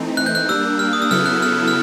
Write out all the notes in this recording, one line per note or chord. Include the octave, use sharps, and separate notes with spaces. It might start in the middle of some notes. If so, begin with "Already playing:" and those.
Already playing: E3 A3 C4 D#4
F#6
G6
F#6
G3 A#3 D4 E6
F6
D#6
E6
C#3 F#3 B3 E4 A4 F6
F#6
F6
F6